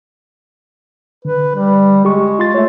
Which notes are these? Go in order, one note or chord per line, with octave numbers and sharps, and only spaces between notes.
D3 B4
G3
G#3 G4 C#6
F4 C6 A6
A3 C#5 E5